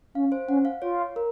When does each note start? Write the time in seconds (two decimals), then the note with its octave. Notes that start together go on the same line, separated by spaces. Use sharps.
0.15 C#4 F5
0.32 C5
0.48 C#4 F#5
0.65 F5
0.82 F4 C#5
1.16 A#4